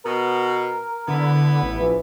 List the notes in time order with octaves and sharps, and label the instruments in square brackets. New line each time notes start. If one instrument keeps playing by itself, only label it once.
[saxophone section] B2 [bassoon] A#4
[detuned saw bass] D3 [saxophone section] B3 E4
[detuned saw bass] A1
[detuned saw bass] A#1 [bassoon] E3